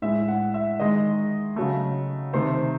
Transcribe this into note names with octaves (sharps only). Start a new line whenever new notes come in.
A2 G#3 E5
F#5
E5
D#3 G#3 D#5
C#3 F#3 A3
C3 D#3 A3 C5